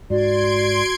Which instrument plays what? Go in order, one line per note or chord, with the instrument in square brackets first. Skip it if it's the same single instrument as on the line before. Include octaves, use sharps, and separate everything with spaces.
[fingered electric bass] G#2 [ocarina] F#4 [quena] D5 [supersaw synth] C6 G#6 D7